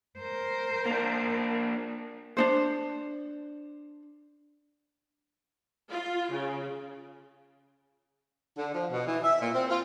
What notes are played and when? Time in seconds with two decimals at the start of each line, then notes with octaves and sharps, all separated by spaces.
0.19 A#4 C5
0.86 A#3 D4
2.37 D4 D#4 C5
5.89 F4
6.31 C#3
8.57 D3
8.74 F3
8.92 B2
9.07 E3
9.23 E5
9.40 A#2
9.54 C4
9.70 F4